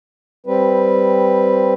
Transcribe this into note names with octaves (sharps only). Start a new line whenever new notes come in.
G3 C4 B4